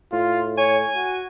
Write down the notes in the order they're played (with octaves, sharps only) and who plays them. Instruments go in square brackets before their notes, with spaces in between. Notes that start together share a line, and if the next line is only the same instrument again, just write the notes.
[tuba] A2 [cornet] F4
[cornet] C#5 [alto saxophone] G#5
[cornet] F#4